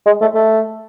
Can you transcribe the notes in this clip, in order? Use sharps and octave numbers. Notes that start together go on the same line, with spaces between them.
G#3
A3
A3